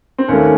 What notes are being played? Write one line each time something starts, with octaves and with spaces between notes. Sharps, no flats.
C4
D#2 D#3 A3 C#4